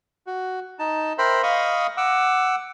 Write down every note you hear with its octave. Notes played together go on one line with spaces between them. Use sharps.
F#4
D#4 A5
A#4 C5 E5 G5 B5 C6
D#5 F5 B5 C#6 D#6
F#5 D6 E6